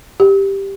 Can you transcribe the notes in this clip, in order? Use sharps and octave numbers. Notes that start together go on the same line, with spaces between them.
G4